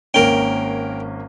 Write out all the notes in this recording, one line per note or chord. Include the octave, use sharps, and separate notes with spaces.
G#1 A#3 C#4 A#4 G5